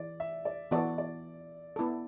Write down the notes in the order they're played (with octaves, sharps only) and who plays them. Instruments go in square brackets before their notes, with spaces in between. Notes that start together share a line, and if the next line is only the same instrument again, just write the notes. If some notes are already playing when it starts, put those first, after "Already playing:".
Already playing: [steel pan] E3 [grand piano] D5
[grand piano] E5
D5
[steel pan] E3 B3 F#4 A4 [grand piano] D5
[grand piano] D5
[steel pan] B3 E4 A4